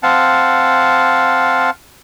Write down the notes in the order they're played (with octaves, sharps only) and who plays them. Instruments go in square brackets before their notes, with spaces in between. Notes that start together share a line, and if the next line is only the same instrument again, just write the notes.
[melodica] C4 F5 F#5 A5